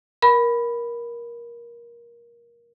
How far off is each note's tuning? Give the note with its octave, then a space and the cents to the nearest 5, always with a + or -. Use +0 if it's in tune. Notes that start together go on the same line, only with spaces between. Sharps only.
A#4 +20 B5 +0